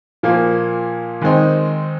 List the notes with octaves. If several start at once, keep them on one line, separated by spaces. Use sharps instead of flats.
A#2 F3 A#3
D#3 G#3 C4 D#4